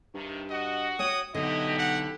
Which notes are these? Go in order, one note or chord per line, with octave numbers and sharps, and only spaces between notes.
G2 C3 D#3
F#4 D#5
C#5 G5 D#6
B1 D3 E4 F#4 G4 D#5
F#5